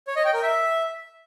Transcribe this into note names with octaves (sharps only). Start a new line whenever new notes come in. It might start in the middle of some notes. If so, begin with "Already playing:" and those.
C#5
D#5
G5
A#4
E5